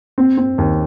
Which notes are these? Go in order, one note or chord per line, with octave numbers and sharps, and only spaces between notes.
C4
C4
D#2